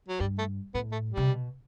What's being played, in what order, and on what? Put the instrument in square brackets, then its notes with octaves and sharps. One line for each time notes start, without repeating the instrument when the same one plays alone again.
[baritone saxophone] F#3
[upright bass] G2 [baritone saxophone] G3
[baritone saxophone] A3
[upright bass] A2 [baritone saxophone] B3
[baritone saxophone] A3
G3
[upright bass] C3
B2